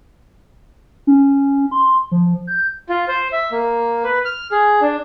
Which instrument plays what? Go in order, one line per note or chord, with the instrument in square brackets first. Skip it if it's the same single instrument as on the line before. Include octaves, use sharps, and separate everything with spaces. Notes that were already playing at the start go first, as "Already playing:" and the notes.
[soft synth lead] C#4
C6
F3
G6
[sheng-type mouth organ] F4
C5
E5
A#3
B4
F6
G#4
D4